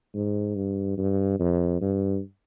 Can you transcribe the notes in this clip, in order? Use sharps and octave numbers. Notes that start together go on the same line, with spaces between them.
G#2
G2
G2
F2
G2